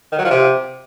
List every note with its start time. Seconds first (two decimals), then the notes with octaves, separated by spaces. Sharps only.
0.12 D#3
0.18 F#3
0.24 F3
0.30 C3